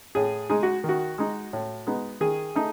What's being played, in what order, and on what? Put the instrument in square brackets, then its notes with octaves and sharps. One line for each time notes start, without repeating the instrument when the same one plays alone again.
[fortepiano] A2 G#4
G#3 D#4 G#4
F#4
D#3
F#4
G#3 D#4
A2
G#3 B3 D#4
D#3 G#4
A3 D#4